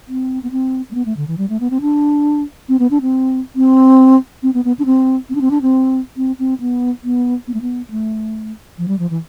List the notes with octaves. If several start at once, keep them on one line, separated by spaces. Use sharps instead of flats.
C4
B3
C4
A3
B3
A3
D3
E3
G3
A3
B3
C4
D4
C4
B3
D4
C4
C4
C4
B3
B3
D4
C4
C4
D4
C4
D4
C4
C4
C4
B3
B3
B3
A3
B3
A3
F3
G3
F3
E3